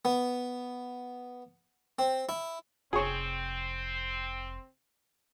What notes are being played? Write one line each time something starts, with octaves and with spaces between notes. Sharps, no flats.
B3
C4
E4
F1 C4 G#4 C#5